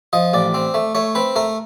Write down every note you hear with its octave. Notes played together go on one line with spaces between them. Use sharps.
F3 D#5
A1 D5
C4
A3
A3 C#5
C4 B4
A3 A#4